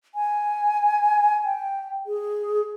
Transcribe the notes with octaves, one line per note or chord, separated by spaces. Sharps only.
G#5
G5
G#4